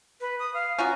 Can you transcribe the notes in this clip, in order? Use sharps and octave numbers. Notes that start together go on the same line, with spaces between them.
B4
D#6
F5
C#4 F4 F#4 A#5